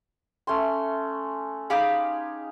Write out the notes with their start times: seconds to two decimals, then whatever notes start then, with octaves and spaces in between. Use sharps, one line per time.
0.47 A3 C#4 C6
1.70 D#4 G4 G#4 F5 B5